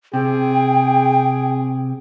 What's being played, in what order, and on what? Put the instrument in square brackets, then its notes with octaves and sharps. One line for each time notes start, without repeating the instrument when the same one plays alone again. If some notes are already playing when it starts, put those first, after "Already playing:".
[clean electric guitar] C3 [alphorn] G#4 [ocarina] G5